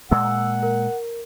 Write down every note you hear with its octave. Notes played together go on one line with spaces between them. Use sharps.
A#2 G#3 A#3 F#5 E6
A#4